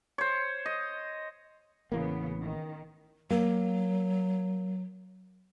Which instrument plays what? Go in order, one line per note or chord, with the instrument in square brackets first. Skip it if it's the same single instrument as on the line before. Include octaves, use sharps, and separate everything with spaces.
[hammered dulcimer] C5 C#5
D#5
[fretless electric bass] A1 E3 A#3 [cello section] C#3 B3
[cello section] D#3
[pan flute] F#3 [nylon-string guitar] A#3